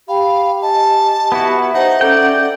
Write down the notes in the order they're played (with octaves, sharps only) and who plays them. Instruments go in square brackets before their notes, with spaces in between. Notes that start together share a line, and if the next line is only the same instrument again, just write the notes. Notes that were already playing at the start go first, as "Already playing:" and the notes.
[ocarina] G4 [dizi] F5 [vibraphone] G5 B5
[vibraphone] D#5 G#5 [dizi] A5
[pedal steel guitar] B3 E4 F#4
[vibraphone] B4 E5
[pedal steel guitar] D#4 [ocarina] C5 [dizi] F#5
[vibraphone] C#4 E5 [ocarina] A4 [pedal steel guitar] D5 G5